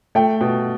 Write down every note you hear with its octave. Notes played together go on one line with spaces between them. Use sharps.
A3 G5
B2